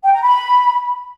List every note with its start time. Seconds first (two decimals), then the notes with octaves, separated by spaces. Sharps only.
0.03 G5
0.12 A#5
0.22 B5